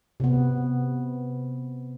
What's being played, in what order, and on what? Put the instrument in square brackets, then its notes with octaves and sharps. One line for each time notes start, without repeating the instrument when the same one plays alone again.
[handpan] C3 B3